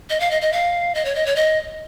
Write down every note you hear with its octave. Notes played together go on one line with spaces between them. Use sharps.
D#5
F5
D#5
D#5
F5
D#5
C#5
D#5
C#5
D#5